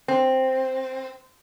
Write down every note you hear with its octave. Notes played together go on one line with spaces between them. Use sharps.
C4